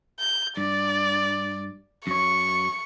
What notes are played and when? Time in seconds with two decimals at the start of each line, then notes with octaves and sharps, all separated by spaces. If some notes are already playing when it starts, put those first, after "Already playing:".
0.20 G6
0.57 G2 D5
2.07 F#2 C#5 C#6